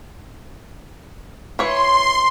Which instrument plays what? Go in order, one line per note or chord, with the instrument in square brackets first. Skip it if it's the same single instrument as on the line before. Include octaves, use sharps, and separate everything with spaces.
[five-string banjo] E3 C#5 [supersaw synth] C6